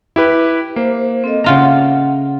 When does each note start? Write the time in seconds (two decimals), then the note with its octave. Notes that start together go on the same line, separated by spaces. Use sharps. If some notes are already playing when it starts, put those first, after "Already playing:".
0.16 E4 G4 B4
0.76 A#3 C5
1.24 C4 A4 D#5
1.44 C#3 F4 E5 F#5 A#5